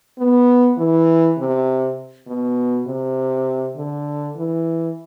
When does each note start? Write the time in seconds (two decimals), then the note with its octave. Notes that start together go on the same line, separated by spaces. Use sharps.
0.19 B3
0.78 E3
1.37 C3
2.27 B2
2.86 C3
3.76 D3
4.36 E3